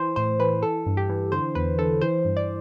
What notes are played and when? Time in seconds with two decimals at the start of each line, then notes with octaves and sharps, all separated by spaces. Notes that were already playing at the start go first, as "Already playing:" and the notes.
Already playing: E3 C5
0.16 A2 C5
0.40 E3 B4
0.62 E3 A4
0.86 G2
0.97 G4
1.09 E3
1.32 D3 C5
1.55 E2 B4
1.78 D3 A4
2.01 E3 C5
2.25 G2
2.37 D5